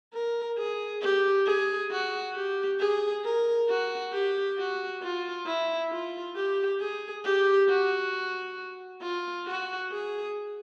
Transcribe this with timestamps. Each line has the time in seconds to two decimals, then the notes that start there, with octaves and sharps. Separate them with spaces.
0.13 A#4
0.58 G#4
1.01 G4
1.46 G#4
1.91 F#4
2.35 G4
2.79 G#4
3.24 A#4
3.69 F#4
4.12 G4
4.58 F#4
5.02 F4
5.46 E4
5.91 F4
6.36 G4
6.80 G#4
7.24 G4
7.69 F#4
9.02 F4
9.46 F#4
9.91 G#4